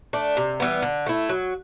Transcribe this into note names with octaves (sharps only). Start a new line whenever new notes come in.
A3 D4
C3
E3 G3 B3
D3
A3 E4
F#3